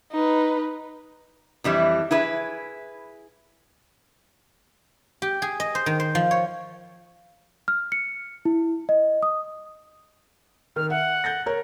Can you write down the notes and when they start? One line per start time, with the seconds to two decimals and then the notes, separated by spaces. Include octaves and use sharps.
0.12 D#4 B4
1.64 F2 E3 G3 E4
2.11 E4 G#4 B4
5.22 G4
5.42 G#4
5.60 D#5
5.75 C5
5.86 D#3
6.00 C5
6.15 F3
6.31 C#5
7.68 F6
7.92 C#7
8.45 E4
8.89 D#5
9.23 D#6
10.76 D#3 F6
10.90 E5 F#5
11.24 G6 A6 A#6
11.46 A#4 C#5